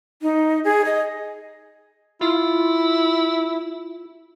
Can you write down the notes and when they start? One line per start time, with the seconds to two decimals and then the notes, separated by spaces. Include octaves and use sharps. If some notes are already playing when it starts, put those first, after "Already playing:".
0.22 D#4
0.64 G#4
0.85 D#5
2.21 E4 F4